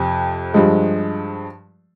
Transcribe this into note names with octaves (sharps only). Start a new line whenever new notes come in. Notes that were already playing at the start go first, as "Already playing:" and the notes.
Already playing: F2 C3
G2 F3 G#3